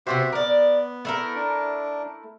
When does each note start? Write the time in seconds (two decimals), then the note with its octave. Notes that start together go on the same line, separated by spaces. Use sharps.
0.07 C3 B3 F#4 G4 C5 E5
0.32 B3 A#4 D5
1.05 A3 E4 A#4
1.36 D4